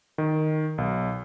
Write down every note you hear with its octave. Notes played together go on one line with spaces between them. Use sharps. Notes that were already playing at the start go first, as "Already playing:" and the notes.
D#3
B1